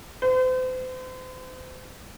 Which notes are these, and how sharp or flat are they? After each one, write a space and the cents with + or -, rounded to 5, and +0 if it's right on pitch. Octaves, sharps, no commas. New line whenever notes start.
C5 -40